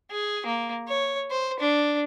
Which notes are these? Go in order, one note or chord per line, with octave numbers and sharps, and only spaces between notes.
G#4
A#3
C#5
C5
D4